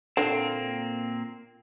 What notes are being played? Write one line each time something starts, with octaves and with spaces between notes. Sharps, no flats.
A#2 D3 A#3 C4